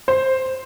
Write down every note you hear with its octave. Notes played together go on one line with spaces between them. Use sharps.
C5